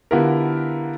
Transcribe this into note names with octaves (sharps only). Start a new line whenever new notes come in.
D3 B3 E4 F4 G4 A#4